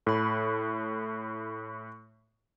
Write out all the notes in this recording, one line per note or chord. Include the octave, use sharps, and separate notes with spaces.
A2 A4 B5